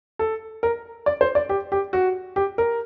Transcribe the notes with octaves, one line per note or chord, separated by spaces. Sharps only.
A4
A#4
D5
C5
D5
G4
G4
F#4
G4
A#4